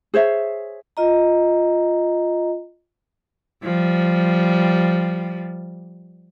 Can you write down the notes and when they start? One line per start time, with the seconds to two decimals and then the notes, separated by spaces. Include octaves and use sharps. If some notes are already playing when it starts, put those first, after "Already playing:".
0.14 G#4 C5 C#5 E5
0.97 F4 D#5 A#5
3.63 F3 G3